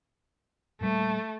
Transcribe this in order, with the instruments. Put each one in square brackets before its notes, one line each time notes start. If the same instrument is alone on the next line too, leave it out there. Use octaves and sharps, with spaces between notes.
[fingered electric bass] A#2 G3 A#3 [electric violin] A3